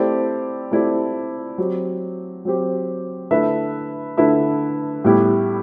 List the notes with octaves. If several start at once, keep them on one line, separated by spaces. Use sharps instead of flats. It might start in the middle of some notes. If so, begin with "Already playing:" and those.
Already playing: A3 C4 E4 G4 D5
A3 C4 E4 G4 D5
F#3 C4 G4
F#3 C4 G4
D3 A3 E4 B4 E5
D3 A3 E4 B4 E5
A2 G3 B3 E4 G4